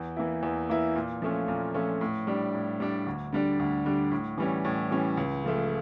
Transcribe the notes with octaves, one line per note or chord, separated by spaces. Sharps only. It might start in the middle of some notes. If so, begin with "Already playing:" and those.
Already playing: E2
E3 A#3 E4
E2
E3 A#3 E4
A#2
F3 A3 C#4
A#2
F3 A3 C#4
A2
G3 D4
A2
G3 D4
D2
D3 G3 D4
D2
D3 G3 D4
A2
E3 G3 C#4
A2
E3 G3 C#4
C#2
C#3 F3 A3